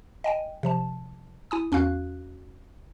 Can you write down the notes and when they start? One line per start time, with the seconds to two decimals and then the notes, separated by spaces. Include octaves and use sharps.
0.24 D#5 G5 G#5
0.63 C3 F3 A5
1.51 E4 G#5 D#6
1.72 E2 C#4 F#4 F5 F#6